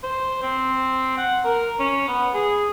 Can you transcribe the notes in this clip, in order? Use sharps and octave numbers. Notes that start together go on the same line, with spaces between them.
C5
C4
F#5
A#4
C#4
B3
G#4